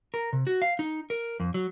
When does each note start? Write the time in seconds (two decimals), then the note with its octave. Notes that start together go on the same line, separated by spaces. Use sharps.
0.14 A#4
0.33 C3
0.47 F#4
0.62 F5
0.79 D#4
1.10 A#4
1.40 F2
1.54 F#3